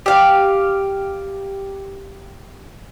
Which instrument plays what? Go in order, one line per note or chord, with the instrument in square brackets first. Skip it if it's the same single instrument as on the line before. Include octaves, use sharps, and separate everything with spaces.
[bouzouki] G4 F5